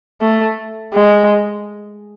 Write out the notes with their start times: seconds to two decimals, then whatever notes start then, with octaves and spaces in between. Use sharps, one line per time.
0.21 A3
0.94 G#3